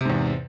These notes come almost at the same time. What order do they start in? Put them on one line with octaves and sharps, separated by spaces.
C3 G#2 E2